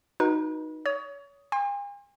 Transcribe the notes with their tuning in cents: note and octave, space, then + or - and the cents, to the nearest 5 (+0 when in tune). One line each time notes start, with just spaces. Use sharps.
D#4 +0 F#4 -10 B4 -35
C#5 +30 D#6 +0
G#5 -45 C6 +25